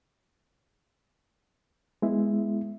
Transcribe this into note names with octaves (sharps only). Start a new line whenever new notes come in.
G#3 B3 E4 E5